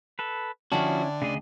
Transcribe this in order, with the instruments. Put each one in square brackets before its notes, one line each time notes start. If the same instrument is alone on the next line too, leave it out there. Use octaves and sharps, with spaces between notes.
[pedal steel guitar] A4 B4
[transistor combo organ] D3 [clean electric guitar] F3 F#4 [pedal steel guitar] C#4 E4 [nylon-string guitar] E5 G5 A5
[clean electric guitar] D2 [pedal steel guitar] C#3 G#4 D#5